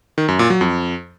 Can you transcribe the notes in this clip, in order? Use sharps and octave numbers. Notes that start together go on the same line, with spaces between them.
D#3
F#2
A#2
F#3
F2